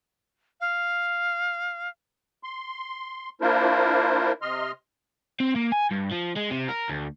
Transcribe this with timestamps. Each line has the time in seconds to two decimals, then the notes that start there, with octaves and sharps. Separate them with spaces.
0.60 F5
2.43 C6
3.41 A#3 D4 E4 F4 A#4 C5
4.42 C3 D#5 C6 F6
5.40 C4
5.56 A#3
5.72 G#5
5.91 G2
6.11 F3
6.36 G#3
6.50 C3
6.69 A#4
6.90 D2